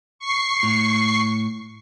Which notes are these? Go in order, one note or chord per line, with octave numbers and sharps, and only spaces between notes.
C#6 C7
A2